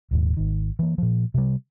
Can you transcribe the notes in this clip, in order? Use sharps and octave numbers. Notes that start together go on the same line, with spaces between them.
D#1 D#2 G#2
G#1 D#3
E3 A#3
A#2 F3
C3 G3